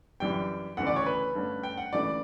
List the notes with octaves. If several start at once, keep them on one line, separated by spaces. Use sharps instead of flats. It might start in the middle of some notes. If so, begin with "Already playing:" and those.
F#2 E3 G3 D4 G5
D2 C#3 E3 B3 F#5
D5
C#5
B4
G2 D3 A3 C#4
G5
F#5
C#2 C#3 E3 A3 D5